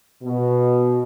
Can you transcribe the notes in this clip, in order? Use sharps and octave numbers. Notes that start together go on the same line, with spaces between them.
B2